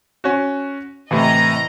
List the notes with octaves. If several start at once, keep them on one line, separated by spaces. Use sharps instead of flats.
C#4 F#4
A2 C3 E3 D#5 A#5